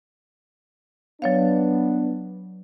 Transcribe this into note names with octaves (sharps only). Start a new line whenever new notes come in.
F#3 B3 D4 C#5 F5